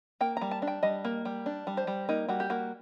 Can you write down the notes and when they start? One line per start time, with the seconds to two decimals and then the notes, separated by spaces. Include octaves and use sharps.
0.21 A#3 G5
0.37 G3 A#5
0.51 A5
0.62 D4
0.67 G5
0.83 G3 D#5
1.05 A#3
1.25 G3
1.46 D4
1.67 G3
1.77 C5
1.87 G3
2.09 A#3 D#4
2.28 G3 F#4
2.40 G4
2.50 A#3 F#4